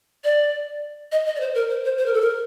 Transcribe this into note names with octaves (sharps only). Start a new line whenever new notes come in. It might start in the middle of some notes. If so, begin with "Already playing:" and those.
D5
D#5
D#5
D5
C5
A#4
C5
C5
C5
A#4
A4
A#4